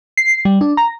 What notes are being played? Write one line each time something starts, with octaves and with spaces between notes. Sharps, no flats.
C7
G3
D4
A#5